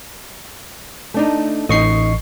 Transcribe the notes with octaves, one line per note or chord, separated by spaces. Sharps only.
A3 D4 D#4
A1 D#4 D#5 C#6 C7